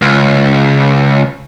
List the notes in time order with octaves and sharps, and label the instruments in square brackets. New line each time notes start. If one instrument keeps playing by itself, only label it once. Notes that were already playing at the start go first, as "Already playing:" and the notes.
[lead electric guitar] C#2